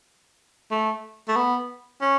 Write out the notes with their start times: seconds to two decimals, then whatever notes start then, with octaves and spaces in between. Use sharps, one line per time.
0.71 A3
1.28 A3
1.36 B3
2.01 C#4